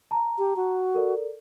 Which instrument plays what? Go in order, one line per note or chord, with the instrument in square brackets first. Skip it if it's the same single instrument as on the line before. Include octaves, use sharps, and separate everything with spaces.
[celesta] A5 A#5
[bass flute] G4
F#4
[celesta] A4 A#4 D5